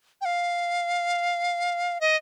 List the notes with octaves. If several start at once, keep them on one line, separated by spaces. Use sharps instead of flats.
G5
F5
D#5